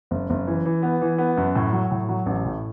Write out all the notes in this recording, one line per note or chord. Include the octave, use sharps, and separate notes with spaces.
F#1
F#1
E3
E3
B3
E3
B3
F#2
A2
F#3
A2
F#3
A1
A2